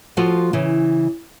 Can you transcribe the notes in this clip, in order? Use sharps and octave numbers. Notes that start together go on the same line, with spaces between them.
F3 F4 F#4 A4
C#3 E3